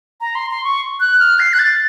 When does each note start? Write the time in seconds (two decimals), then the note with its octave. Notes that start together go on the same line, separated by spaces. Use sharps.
0.21 A#5
0.35 C6
0.50 C6
0.64 C#6
1.00 F#6
1.20 F6
1.39 C7
1.53 F#6
1.59 A6